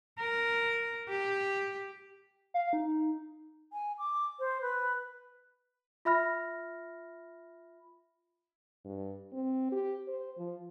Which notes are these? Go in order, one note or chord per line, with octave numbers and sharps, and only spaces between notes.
A#4
G4
F5
D#4
G#5
D6
C5
B4
F4 E5 B5 F6 A#6
G2
C4
G4
C5
F3